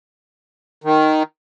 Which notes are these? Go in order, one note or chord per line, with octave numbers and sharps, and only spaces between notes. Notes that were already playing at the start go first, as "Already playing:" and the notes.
D#3